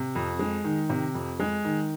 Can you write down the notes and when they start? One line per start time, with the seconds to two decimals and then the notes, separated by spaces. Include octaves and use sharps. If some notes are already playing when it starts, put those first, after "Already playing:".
Already playing: C3
0.15 F2
0.39 G#3
0.64 D#3
0.90 C3
1.14 F2
1.40 G#3
1.64 D#3